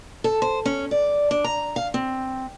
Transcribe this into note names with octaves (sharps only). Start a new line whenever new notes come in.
A4
C5
C#4
D5
D4
A#5
F5
C4